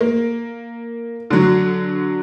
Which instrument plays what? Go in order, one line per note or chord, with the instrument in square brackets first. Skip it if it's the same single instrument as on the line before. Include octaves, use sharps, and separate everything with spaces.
[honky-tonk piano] A#3
D3 F#3